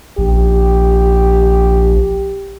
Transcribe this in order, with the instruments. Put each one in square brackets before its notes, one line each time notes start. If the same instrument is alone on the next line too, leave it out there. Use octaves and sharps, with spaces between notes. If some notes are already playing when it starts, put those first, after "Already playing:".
[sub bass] A#1 [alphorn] G4